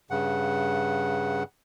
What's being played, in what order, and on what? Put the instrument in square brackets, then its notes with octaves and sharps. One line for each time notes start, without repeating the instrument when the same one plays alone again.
[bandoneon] G2 C#3 F#5